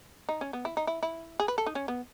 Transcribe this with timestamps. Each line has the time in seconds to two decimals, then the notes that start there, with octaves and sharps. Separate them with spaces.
0.29 D#4
0.41 C#4
0.53 B3
0.65 E4
0.77 D#4
0.87 E4
1.03 E4
1.40 G#4
1.48 B4
1.58 A4
1.66 D#4
1.75 C#4
1.88 B3